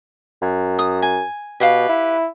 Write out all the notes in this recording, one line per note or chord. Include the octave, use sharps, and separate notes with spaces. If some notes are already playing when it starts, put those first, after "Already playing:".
F#2
D#6
G#5
B2 G4 B4 F5
E4